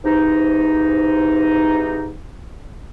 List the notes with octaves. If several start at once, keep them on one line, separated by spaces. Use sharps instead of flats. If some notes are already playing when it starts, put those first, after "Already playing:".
G#2 C3 E3 D#4